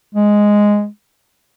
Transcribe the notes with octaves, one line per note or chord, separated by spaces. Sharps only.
G#3